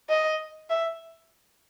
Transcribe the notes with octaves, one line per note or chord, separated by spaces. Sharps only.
D#5
E5